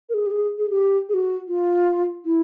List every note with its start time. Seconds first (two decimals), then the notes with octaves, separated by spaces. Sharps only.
0.09 A#4
0.14 G#4
0.26 G4
0.31 G#4
0.58 G#4
0.70 G4
1.09 G#4
1.14 F#4
1.48 F4
2.25 E4